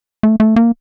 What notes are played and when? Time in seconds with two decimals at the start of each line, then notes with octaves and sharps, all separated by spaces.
0.23 A3
0.40 A3
0.56 A#3